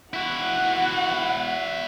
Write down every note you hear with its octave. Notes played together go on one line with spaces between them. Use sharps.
E4 F#4 F#5